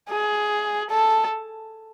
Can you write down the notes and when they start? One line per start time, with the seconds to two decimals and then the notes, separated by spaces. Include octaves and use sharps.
0.09 G#4
0.90 A4